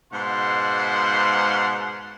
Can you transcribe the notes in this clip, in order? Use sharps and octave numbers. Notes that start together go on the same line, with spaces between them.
G#2 B2 F5 F#5 C6